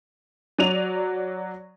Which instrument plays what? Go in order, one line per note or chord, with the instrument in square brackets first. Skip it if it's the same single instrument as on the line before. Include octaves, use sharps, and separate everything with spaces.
[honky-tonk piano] F#3 D5 D#7 F7